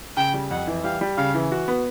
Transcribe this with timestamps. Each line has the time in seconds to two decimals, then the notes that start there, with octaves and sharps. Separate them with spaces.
0.17 C#3 G5
0.34 G3
0.51 F2 F#5
0.67 E3
0.84 G3 F5
1.01 G3
1.17 C#3 F5
1.34 E3
1.52 F#4
1.68 B3